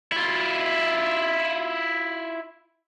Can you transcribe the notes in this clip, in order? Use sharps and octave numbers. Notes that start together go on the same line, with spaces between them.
E4 F4